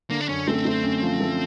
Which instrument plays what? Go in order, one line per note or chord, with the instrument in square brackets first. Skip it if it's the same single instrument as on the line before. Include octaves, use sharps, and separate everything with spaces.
[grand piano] D3 [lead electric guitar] A#3
[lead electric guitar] D4
[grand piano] F#2 [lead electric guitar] C#4
[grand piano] A3 [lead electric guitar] C4
[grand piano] A3
F#2
F3
A3